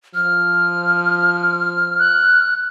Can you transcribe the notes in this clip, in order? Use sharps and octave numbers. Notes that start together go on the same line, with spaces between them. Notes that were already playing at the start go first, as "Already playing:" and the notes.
F3 F6
F#6